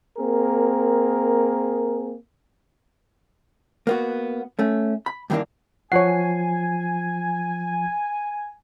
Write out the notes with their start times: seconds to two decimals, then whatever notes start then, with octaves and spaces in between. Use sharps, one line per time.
0.17 A#3 C4 G#4 A#4
3.87 A#3 B3 F#4
4.59 A3 C#4
5.06 B5
5.30 G2 D#3 E3 A3 A#3 D4
5.92 F3 C#5 F#5 G#5 C7